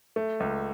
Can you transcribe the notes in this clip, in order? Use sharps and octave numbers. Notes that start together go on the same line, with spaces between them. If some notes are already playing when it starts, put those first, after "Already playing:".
A3
C#2